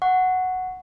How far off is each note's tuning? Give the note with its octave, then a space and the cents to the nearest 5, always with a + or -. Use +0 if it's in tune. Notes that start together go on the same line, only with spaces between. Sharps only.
F#5 +0 C#6 +0